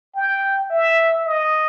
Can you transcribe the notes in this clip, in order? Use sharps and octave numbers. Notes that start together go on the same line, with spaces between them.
G5
E5
D#5